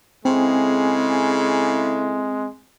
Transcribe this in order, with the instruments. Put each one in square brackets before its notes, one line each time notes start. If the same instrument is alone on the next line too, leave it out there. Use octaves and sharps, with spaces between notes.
[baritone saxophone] C#3 [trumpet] G#3 [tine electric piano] C4 [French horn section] E4 A4